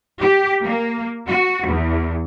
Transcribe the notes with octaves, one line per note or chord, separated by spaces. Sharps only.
G4
A#3
F#4
E2